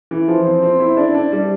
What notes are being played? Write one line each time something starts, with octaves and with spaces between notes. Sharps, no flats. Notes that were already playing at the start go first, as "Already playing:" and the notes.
E3
F3
C4
C4
E4
D4
D4
G3